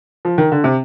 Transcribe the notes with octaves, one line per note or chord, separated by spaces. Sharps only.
F3
D#3
D3
C3